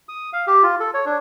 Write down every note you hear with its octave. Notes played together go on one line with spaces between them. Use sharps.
D#6
F5
G4
F4
A4
C#5
D4